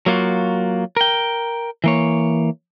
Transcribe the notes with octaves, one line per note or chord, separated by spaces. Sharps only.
F#3 A#3 F4 F#4
A#4 G5
E3 A#3 C#5